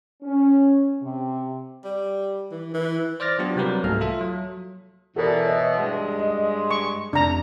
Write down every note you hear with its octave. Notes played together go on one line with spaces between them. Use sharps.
C#4
C3
G3
E3
E3
C5 D5 D6 F6 A6 A#6
F#3 B3 D4 F4 G4
C3 F#3 G3 F#4 A#4 B4
C2 G#2 A3 A#3 A4 F6
F4 A4 E5
F#3
B2 E3 A4 A#4 D5
C#5 D#5 E5
G2 G#3
D#5
C#6
F1 D4 A#5